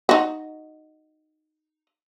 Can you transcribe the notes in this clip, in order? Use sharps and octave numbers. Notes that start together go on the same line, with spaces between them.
D#4 F#4